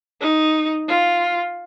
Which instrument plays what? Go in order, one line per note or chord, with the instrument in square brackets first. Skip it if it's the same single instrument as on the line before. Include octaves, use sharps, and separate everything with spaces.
[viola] D#4
F4